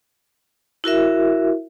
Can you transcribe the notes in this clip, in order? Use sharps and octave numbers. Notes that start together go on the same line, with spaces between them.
E4 F#4 A#4 E5